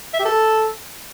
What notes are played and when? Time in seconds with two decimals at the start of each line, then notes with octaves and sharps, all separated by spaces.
0.14 E5
0.19 G4
0.25 A4